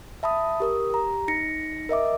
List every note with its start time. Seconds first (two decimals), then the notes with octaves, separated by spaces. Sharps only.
0.23 E5 A5 B5 D#6
0.60 G4 A#4 D#6
0.90 G4 A#5
1.28 D#4 A#6 C#7
1.89 A#4 D#5 E5 D6